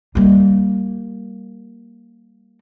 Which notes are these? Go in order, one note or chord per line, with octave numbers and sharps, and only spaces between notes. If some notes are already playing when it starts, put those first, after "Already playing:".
G3 A#3